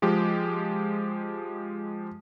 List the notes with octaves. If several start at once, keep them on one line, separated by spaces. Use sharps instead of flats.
F3 G#3 G4